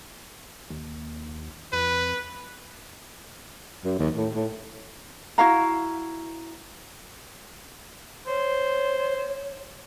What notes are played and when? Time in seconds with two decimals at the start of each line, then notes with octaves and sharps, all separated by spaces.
0.70 D#2
1.73 F2 B4
3.84 F#2
3.99 D#2
4.16 A2
4.35 A2
5.38 E4 F#4 F5 A#5
8.27 C5 C#5